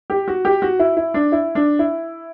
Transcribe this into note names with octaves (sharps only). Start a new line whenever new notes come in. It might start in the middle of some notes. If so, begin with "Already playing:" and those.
G4
F#4
G4
F#4
E4
E4
D4
E4
D4
E4